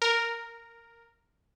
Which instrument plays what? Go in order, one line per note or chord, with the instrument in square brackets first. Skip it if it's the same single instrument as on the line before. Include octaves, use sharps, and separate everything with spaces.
[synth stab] A#4